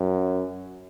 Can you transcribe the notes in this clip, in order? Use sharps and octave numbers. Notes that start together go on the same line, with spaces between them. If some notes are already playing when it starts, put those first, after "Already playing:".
Already playing: F#2